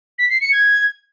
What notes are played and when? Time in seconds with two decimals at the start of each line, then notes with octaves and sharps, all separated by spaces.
0.18 B6
0.30 C7
0.41 C#7
0.52 G#6